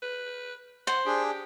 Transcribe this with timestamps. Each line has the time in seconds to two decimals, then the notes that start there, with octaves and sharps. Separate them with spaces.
0.02 B4
0.87 C5 F#5
1.06 D4 G4 G#4